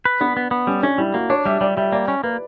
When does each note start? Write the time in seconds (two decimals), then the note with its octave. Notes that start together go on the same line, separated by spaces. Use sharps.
0.05 B4
0.21 B3 D4
0.37 B3
0.51 B3
0.67 G3 C#4
0.83 C#4 D4
0.98 G3 E4
1.14 A#3 F#4
1.30 D4 C#5
1.45 G3 E5
1.61 G3 D5
1.77 G3 E5
1.92 A#3 D5
2.08 C#4
2.24 A#3 B4